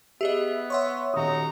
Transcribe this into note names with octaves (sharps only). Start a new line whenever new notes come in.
B3 G4 G#4 D#5 E5
C#5 E5 F#5 C6 C#6
D#1 D#4 F#4 A#5 D#6